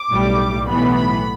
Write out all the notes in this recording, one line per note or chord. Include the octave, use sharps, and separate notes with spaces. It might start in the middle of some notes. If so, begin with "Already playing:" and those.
Already playing: D6
B1 A2 G3
B1 A2 E3 B3 B5
B5